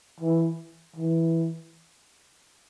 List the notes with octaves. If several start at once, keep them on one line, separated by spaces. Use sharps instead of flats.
E3
E3